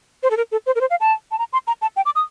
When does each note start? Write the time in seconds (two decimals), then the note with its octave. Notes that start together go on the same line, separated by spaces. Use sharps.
0.23 C5
0.31 A4
0.37 A#4
0.52 A4
0.66 C5
0.75 A#4
0.81 C5
0.90 F5
1.00 A5
1.31 A5
1.39 A#5
1.53 C6
1.67 A#5
1.82 A5
1.96 G5
2.05 D6
2.15 D#6